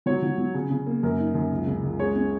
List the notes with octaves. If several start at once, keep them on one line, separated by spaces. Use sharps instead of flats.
F#3 C#5
F#3
F#3
C#3
C#3
A#3
F#2 A#4
D#4
F#2
C#2
C#3
C#2
G#3 C#5
C#4